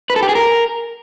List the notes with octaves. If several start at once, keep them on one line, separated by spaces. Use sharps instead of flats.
B4
A4
G4
G#4
A#4